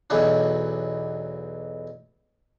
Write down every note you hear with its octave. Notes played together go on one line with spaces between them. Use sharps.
B1 E2 B2 F#3 D4